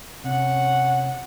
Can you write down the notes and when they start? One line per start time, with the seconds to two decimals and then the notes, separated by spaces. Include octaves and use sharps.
0.24 C3 C#4 F#5